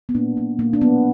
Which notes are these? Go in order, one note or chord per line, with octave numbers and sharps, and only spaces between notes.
B3
A#2 A#3 D4
F#3 A#3
A#2 A#3
D4
F#3 A#3 B3